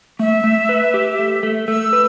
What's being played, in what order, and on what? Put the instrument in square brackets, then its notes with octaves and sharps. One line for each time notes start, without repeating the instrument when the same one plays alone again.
[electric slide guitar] A3 [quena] E5
[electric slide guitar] A3
B4
G4
A3
A3
[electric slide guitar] A3 [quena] E6
[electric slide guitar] B4